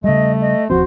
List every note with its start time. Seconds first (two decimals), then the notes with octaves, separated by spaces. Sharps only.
0.04 C#3 G3 A3 D#5
0.41 D#5
0.70 D#1 F3 C4 F#4 C5